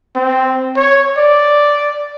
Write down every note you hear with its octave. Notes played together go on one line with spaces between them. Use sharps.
C4
C#5
D5